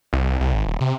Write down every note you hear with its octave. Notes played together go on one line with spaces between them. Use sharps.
C2
C2
G#1
D#1
C3